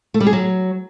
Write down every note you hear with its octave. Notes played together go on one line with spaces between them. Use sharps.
A3
G3
G#4
F#3